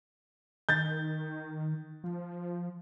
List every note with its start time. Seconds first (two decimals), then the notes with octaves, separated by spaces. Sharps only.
0.69 D#3 G6 A6
2.04 F3